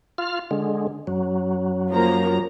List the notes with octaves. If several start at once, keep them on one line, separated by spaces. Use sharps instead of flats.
F4 F6
D3 G#3
F#2 F#3
F3 A#3 A#5